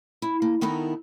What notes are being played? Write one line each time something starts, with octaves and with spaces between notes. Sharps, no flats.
E4
A#3
D#3 B3 D#4 E4 A4 A#4